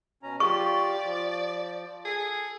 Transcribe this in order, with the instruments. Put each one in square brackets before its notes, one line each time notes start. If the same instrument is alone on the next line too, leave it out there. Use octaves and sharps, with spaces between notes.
[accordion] B2 C#4 A#5
[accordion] F4 G4 [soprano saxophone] D5 [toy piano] C#6
[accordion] F3
[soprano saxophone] G#4 [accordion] A4